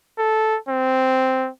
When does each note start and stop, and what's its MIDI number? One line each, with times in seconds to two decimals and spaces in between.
0.18 0.57 69
0.69 1.49 60